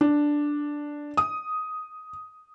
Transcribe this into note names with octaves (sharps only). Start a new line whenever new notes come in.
D4
D#6